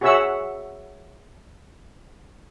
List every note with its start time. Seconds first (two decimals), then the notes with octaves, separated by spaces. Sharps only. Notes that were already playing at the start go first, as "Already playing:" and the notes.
0.01 F#4 G#4 C#5 E5 F#5 E6